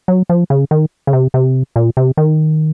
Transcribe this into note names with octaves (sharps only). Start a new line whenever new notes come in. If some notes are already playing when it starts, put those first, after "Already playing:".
F#3
F3
C#3
D#3
C#3
C3
C3
A#2
C3
D#3